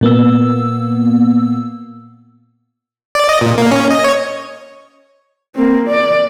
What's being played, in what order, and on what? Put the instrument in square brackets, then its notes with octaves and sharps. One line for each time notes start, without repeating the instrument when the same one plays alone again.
[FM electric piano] A#2 A#3 B3 E6
[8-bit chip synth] D5
D#5
A#2
A#3
C#4
D#5
C#5
[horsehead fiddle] A#3 C4
D5